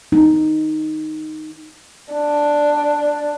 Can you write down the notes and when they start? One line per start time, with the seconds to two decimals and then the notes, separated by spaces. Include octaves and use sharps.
0.12 D#4
2.13 D4